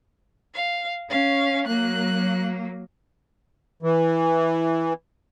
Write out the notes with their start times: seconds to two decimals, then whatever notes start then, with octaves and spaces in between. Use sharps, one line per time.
0.54 F5
1.10 C#4 F5
1.67 F#3 A#3 F#6
3.83 E3